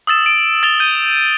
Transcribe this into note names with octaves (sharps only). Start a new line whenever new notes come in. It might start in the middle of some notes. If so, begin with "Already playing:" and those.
D#6 E6 A6 E7
D7
E6 A6 F7 G7
G6 D#7